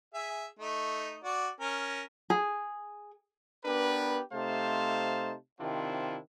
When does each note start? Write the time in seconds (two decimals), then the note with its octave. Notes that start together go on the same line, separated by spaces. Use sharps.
0.14 G#4 E5
0.59 A3 D#4
1.24 F#4 D5
1.60 C#4 A#4
2.30 G#4
3.65 B3 D4 G4 A#4 B4
4.33 C3 A3 D#4 C5 F5 A5
5.60 C3 D#3 C4 D4 E4 F4